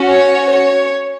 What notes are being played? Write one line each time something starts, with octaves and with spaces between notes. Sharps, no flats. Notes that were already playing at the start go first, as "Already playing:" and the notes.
Already playing: C#4 F#4
C#5
C#5